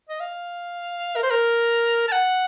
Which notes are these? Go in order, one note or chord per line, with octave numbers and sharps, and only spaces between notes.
D#5
F5
A#4
C5
A#4
A5
F#5